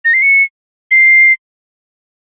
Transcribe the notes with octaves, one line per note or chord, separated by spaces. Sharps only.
A#6
C7
C#7
C7